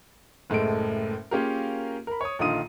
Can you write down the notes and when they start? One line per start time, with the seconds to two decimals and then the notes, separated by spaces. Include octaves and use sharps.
0.50 F#1 A2 G#3 A4 D7
1.31 A#3 C#4 F4 G4 G#4 A#4
2.07 A#4 B5
2.21 C#5 D#6
2.39 A#1 D3 D#3 F4 D#6 D#7